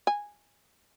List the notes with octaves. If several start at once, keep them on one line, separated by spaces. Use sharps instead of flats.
G#5